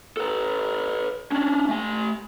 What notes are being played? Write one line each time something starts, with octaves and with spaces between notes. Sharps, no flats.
A4 B4
C#4 D4
A3 G#5